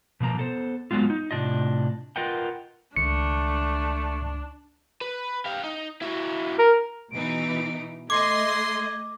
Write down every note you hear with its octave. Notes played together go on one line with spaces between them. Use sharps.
B2 F3 A#3 A#5
B3 A4 C5
F#3 G#3 B3 F4
D#4
A2 C3 D4 F4 D#5
F4 A#4 B4 D#5 F#5 G5
C#2 D#3 A3 D4 C#7
B4
G4 F5
D#4
F#3 E4
A#4
B2 E3 D#4 D7
A3 D#5 C6 D6 G#6